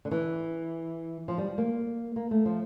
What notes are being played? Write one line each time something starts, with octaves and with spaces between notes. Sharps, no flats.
D3
E3
F3
G3
A#3
A#3
A3
F3